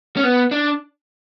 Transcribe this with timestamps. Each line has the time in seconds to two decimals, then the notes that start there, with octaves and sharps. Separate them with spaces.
0.17 C#4
0.24 B3
0.51 D4